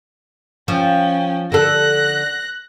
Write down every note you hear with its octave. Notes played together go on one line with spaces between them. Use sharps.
F3 C#4 G5
D3 A4 F#6 A#6